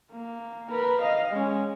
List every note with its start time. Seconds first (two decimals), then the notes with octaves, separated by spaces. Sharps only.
0.11 A#3
0.71 A#4 B4
1.01 D#5 F5
1.30 G#3 C#4